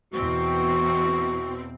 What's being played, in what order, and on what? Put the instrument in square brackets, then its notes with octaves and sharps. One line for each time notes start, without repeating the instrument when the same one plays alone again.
[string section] E2 B2 C4 [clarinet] F#4